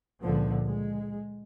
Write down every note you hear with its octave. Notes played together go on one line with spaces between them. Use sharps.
C#2 A#2 D3 F3
G#3